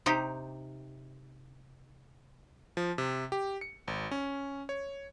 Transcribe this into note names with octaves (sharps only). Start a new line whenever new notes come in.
C3 D#4 G4
F3
C3
G4
C#7
G#1
C#4
C#5